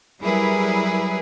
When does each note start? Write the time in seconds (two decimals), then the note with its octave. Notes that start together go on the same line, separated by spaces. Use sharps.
0.21 F#3 G3 E4 G#4 A#4 B4